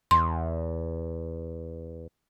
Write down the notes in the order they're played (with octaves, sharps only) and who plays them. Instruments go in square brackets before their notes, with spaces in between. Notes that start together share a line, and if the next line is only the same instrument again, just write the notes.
[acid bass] E2 [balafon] C6